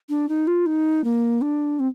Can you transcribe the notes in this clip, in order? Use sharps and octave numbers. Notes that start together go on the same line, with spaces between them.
D4
D#4
F4
D#4
A#3
D4
C4